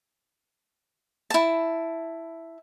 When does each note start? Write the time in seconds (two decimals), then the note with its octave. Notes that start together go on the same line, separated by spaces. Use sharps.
1.30 E4 A5